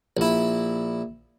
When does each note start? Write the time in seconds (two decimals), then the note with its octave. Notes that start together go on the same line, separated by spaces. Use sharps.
0.17 A#1 E4